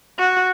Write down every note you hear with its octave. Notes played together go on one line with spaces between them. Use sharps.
F#4